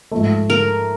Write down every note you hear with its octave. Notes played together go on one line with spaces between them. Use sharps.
G#2 F3 A3
A#4